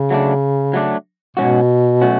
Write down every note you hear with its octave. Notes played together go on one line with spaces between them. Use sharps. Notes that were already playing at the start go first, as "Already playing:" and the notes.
Already playing: C#3
F#3 A3 D4
F#3 A3 D4
G#2 B2 F#3 A3 C#4 F#4
F#3 A3 C#4 F#4